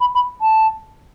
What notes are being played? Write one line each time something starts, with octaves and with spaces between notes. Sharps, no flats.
B5
B5
A5